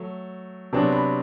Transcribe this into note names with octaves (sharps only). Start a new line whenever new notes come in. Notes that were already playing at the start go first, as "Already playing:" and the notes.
Already playing: F#3 A3
C3 F#3 B3 D4
B5